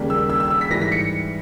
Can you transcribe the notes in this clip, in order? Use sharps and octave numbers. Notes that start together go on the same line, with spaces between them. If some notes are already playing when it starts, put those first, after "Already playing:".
Already playing: D#2 C#3 G3 A#3
E6
E6
E6
E6
B6
G#2 E3 G3 A#6
B6
C#7